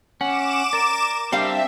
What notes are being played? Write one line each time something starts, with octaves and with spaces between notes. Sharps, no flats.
C#4 F#5 D6 E7
A#4 D5
G3 C4 D4 E5 F5